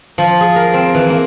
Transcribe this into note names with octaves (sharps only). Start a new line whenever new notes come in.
F3
G#4
A#4
C4
E3
A#3